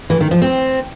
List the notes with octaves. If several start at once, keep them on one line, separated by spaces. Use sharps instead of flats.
E3
D#3
F3
C4